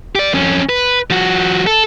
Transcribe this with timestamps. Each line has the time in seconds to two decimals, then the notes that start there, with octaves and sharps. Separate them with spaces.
0.15 G4 D5
0.34 F2 C#4
0.69 B4
1.10 F3 F#4
1.67 A4